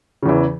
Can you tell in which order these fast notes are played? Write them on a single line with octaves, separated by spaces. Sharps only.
C#3 E2 E3